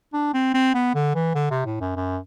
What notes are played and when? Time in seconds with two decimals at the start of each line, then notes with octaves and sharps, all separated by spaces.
0.13 D4
0.34 C4
0.54 C4
0.75 B3
0.95 D3
1.15 E3
1.35 D3
1.51 C3
1.66 A2
1.81 F#2
1.96 F#2